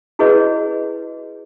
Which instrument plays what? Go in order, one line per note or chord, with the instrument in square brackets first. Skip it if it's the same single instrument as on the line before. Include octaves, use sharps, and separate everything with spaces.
[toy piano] E4 F#4 G#4 B4 C#5 D#5